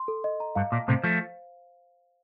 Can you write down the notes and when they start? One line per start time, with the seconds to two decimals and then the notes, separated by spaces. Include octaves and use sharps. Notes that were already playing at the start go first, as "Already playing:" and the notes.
Already playing: C6
0.08 A4
0.24 D#5
0.40 A#5
0.55 G2 F5
0.72 A#2 A5
0.88 A2 C3 C5
1.04 F3 A3 F5